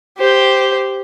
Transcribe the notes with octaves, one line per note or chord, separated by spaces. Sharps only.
G4 C5